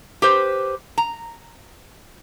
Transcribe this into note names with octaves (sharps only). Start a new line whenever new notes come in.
G4 B4 C5
A#5